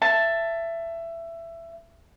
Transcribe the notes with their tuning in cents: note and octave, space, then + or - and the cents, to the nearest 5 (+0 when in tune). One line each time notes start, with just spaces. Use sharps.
E5 +20 A5 +10